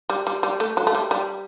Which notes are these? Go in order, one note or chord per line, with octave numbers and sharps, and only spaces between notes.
G3
G3
G3
A3
F#3
A3
G3
G3